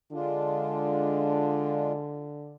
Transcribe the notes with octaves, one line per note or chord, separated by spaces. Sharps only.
D3 G#3 D4 F4